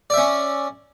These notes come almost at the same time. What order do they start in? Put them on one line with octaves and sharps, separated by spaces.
D5 E5 C#4